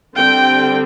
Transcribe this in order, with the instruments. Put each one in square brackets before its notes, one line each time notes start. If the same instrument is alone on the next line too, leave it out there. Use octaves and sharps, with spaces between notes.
[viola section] D3 G3 C4 G5